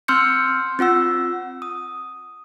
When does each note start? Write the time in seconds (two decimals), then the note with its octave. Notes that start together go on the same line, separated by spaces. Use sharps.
0.08 C4 C6 E6 F6 G6 C#7
0.79 C4 F4 F#5 E6
1.62 D#6